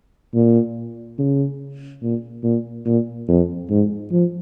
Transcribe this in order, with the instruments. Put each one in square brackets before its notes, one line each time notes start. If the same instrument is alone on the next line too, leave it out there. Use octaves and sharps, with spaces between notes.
[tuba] A#2
C#3
A#2
A#2
A#2
F2
G#2
F3